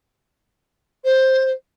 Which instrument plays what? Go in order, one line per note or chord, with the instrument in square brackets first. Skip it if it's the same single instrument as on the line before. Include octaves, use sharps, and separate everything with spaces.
[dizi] C5